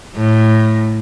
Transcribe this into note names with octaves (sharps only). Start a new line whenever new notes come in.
A2